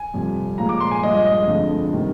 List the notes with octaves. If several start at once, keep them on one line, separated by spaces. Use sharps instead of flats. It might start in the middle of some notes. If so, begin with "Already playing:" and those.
Already playing: G#5
F2 C3 G3
A#2 F3 G#3 A#5
D6
C6
G#5
G2 F3 G#3 D#5
D#5
D#5
F2 D3 F3 G#3
C3 D#3 G3